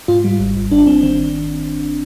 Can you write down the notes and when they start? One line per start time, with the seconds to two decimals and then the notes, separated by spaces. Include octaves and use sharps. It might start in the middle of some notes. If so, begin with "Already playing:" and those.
0.08 G#2 F4
0.24 G3
0.40 G#1
0.56 G#1
0.71 G#1 D4
0.86 G#1 C4
1.03 D#3 C4